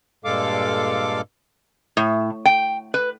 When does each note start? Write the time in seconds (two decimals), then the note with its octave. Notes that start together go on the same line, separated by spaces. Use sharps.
0.25 G2 A#2 G#3 A4 F5 D6
1.97 A2
2.45 G5
2.94 B4